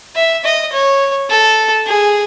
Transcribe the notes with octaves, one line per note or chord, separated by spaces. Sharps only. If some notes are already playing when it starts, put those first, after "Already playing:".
E5
D#5
C#5
A4
G#4